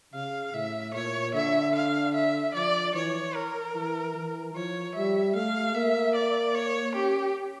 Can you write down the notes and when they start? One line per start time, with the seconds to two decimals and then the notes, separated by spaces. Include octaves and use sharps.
0.13 C#3 F5
0.54 A2 E5
0.94 A#2 C#5
1.34 D3 E5
1.75 F5
2.14 E5
2.54 F3 D5
2.94 E3 C#5
3.34 A#4
3.75 E3
4.15 E3
4.54 F3 C#5
4.95 G3 E5
5.35 A3 F5
5.75 A#3 E5
6.15 D5
6.54 C#5
6.95 C#4 G4